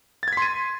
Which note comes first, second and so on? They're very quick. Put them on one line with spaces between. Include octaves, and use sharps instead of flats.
A6 G#6 B6 C6 D#7